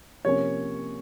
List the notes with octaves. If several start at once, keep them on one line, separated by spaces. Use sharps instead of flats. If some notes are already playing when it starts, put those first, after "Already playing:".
C3 F3 A#3 C#4 C#5